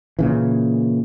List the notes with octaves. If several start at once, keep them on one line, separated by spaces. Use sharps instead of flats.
A#2 C#3 E3